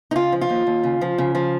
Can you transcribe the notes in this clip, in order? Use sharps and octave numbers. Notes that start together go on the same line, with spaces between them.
D#4
C#3 F4
F3
F4
D#2
D#2
C#3
F3
C#3
F3